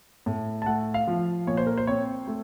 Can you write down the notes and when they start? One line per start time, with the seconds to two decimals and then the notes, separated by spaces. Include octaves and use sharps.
0.26 A2
0.62 A5
0.66 A3 F#5
0.94 F5
1.07 F3
1.47 A#2 C#5
1.57 C5
1.67 A#4
1.78 C5
1.87 C4 C#5
2.27 A3